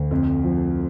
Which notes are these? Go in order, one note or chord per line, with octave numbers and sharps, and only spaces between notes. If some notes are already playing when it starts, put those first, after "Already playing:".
Already playing: D2
F2
F3